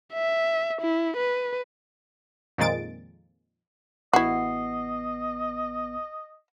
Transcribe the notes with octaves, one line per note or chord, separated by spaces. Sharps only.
E5
E4
B4
F2 A#2 D#3 G#3 A6 D7
A1 B3 E4 F#4 D#5 C7